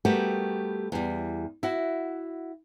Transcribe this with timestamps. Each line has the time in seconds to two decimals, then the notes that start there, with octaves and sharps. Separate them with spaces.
0.05 G3 A3 B3 F#4 G4 A#4
0.92 E2 G3
1.63 E4 F#4